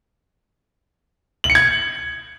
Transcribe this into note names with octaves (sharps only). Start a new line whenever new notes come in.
F#7
C#7
G#6